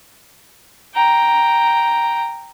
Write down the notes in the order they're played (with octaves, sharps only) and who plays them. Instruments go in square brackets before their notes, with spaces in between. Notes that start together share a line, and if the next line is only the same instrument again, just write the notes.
[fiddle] G5 A#5